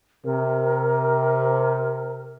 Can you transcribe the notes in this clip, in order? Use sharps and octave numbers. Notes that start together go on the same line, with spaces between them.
C3 A#4